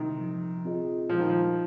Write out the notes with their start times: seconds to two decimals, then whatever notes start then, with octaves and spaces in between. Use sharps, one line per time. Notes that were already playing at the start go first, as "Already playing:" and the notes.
Already playing: C3 D#3
0.21 F3
0.65 C4 F4 G#4 D#5
1.09 A#2 F3
1.19 D#3
1.30 F3